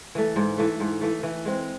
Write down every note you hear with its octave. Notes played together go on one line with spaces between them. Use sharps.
E3 A3
G#2
E3 A3
G#2
E3 A3
E3
G#3 C4